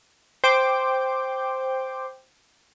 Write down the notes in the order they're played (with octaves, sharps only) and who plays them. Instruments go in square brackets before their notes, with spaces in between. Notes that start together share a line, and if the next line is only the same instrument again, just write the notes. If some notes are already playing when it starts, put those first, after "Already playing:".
[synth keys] C5 G5 D6